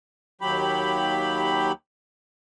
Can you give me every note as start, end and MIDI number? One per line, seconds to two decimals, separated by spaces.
0.41 1.72 39
0.41 1.72 54
0.41 1.72 67
0.41 1.72 83